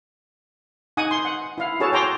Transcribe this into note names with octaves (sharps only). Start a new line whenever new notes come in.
D#4 F#5 G#5 D#6
C6
F#5
E4 F5
F#4 G#4 A4 C#5 A5
C#5 G5 A#5 C6 D6